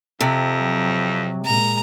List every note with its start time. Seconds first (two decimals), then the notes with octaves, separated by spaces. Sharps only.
0.21 F2 C3
0.58 F#3
1.45 A#2 G#3 A#5